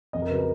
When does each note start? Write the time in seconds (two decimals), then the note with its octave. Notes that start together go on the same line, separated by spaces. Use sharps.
0.13 F2 D#5
0.22 A#4
0.29 C#3 F#3 B4
0.39 A#4